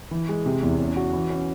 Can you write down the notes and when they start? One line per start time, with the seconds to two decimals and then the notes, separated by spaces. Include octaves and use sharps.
0.11 E3
0.29 G#3
0.46 C3
0.63 E2
0.80 C#4
0.97 F#4
1.13 E3
1.30 C#4